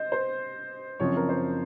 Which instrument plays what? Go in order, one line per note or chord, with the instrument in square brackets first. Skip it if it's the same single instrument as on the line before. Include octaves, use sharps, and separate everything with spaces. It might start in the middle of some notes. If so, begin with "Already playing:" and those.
Already playing: [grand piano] C5 D#5
C5
F#1 F#2 F3 C4 C#5
A#4
C5